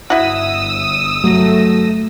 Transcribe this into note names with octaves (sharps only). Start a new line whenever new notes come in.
G1 E4 F#4 D#6 E6
F#3 A3 A#6